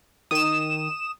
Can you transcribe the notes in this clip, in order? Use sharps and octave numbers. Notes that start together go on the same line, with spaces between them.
D#3 D#6 E7